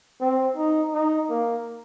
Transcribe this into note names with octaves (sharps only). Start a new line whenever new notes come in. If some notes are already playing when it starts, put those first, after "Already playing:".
C4
D#4
D#4
A#3